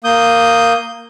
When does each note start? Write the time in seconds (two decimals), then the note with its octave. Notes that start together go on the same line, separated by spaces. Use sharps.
0.04 A#3 D#6 G6